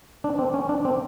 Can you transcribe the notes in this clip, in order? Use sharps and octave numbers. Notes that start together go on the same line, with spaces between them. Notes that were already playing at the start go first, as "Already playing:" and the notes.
D4
C4
C#4
D4
C4